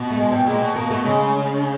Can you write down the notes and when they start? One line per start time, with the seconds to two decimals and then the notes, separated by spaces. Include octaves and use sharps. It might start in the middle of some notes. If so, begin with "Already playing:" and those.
Already playing: B2
0.10 A3
0.18 G#3
0.32 G3
0.47 A#2 G#3
0.61 B2
0.76 B2 A#3
0.90 B2 A3
1.05 C#3 G#3